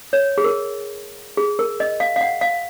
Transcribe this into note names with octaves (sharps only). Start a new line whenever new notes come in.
C#5
G#4
A#4
G#4
A#4
D#5
F5
F5
F#5
F5